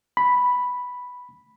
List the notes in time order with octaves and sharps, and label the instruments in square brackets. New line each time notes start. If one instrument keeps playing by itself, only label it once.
[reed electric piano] B5